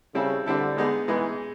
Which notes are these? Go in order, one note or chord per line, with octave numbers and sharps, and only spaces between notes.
C#3 G3 C4 E4 A4
D3 G3 C4 E4 A4
G#3 B3 D#4 G#4
E3 G#3 B3 D#4 G#4